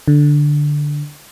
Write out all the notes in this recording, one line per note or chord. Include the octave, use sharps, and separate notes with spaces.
D3